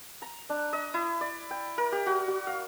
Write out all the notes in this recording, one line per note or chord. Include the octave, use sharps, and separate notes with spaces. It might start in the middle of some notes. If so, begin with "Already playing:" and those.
A#5
D4
D#5
E4
D5
G5
A#4
G4
F#4
F#4
F5